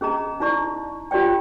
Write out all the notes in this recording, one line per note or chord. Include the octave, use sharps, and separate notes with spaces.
C#4 G#4 D#5 A#5
D#4 E4 D5 C#6
F4 G4 C#5 D5 G5